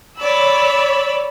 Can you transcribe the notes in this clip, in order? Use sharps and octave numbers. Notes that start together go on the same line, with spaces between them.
C#5 D5 B5 E6